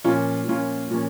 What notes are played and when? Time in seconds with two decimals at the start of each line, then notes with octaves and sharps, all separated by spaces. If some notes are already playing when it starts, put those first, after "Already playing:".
0.04 A#2 F3 A#3 C#4 F4
0.48 A#2 F3 A#3 C#4 F4
0.91 A#2 F3 A#3 C#4